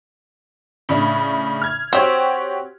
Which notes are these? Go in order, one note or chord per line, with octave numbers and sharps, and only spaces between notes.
A2 C#3 D4
F6 G#6
C4 F#4 G4 C#5